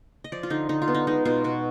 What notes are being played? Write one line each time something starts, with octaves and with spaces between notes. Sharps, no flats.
D#5
F3 D5
F4
D3 D#4
D3 D#4
F4
B3
D#4
G#3 D#4
B2 F4
B2 F#4